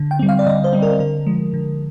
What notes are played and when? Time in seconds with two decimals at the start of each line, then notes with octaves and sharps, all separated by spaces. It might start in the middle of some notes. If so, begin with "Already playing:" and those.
Already playing: D3
0.11 G5
0.19 G3 C4
0.29 F5
0.39 D5
0.46 D3 D#5
0.64 C5
0.73 G3 C4
0.82 A#4
0.99 D3 A#4
1.26 F3 G#3
1.54 D3